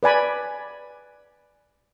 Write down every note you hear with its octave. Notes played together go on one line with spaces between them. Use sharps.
B4 D5 G#5 B5